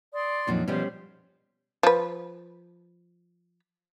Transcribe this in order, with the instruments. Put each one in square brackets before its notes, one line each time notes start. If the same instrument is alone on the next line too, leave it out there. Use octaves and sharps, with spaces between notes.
[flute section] D5 C6 D#6
[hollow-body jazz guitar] F2 A#2 [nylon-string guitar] D#3 F#3 D4
[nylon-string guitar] B2 F3 [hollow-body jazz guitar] G3 C#4 [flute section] C5
[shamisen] F3 B4